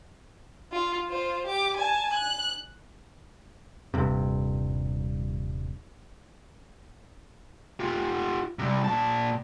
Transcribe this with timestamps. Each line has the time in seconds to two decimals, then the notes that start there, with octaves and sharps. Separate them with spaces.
0.73 F4
1.08 F4 C5
1.46 G4 D6
1.77 G#5 A5
2.14 F#6
3.94 D#1 G2 C3
7.80 F4 G4
8.59 C3 G3
8.84 A#2 A5